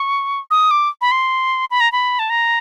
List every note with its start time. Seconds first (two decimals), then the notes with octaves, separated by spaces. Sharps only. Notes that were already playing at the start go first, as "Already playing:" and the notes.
Already playing: C#6
0.51 D#6
0.71 D6
1.01 B5
1.12 C6
1.71 B5
1.80 A#5
1.92 B5
2.19 A5
2.30 A#5